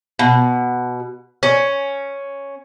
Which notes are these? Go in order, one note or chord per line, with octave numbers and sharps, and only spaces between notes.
B2
C#4